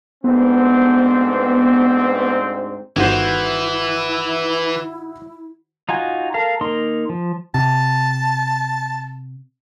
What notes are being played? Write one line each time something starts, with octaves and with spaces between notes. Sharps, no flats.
D2 G#2 B3 C4
G1 D#3 E3 E4 F#4 C5
D#4 F4 F#4 G#5
A4 A#4 F5
A#3 D#4 A#4 C6
F3
C3 A5